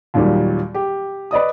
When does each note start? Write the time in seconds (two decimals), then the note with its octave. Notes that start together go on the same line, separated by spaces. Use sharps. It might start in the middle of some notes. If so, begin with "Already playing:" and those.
0.14 D#2 A#2 D#3 F#3 G3
0.74 G4
1.31 B4 D5 D#5 D#6